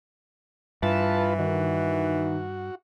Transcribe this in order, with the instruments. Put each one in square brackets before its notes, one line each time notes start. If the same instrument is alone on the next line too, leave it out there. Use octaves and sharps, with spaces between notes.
[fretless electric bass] G2 [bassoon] E3 [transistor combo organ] F4 B4 [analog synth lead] A5
[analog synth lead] D#3 [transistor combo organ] F#4